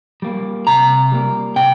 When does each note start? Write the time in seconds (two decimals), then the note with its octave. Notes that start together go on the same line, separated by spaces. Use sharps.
0.22 G3 A#3
0.67 C3 A#5
1.12 G3 A#3
1.56 C3 G5